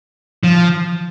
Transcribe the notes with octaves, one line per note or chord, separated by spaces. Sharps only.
F3